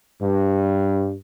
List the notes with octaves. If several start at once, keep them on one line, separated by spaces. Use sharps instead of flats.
G2